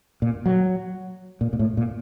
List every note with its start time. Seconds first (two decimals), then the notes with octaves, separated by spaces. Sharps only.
0.22 A#2
0.46 F#3
1.41 A#2
1.53 A#2
1.59 A2
1.77 A#2